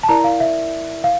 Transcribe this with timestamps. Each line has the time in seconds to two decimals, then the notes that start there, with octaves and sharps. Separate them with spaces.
0.03 A5
0.09 E4 A#4 D5 A#5
0.24 F5
0.40 E5
1.04 F5